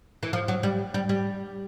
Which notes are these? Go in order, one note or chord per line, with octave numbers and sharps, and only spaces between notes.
E3
F3
F#3
G3
G3
G3